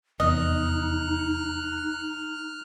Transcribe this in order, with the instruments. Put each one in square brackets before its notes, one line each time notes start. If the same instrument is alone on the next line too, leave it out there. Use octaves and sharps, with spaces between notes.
[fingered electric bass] F1 E2 [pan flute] D#4 [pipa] D#5 [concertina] F6 F#6